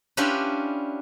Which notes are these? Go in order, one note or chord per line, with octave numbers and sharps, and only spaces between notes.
C#4 D4 E4 F4 G4 B4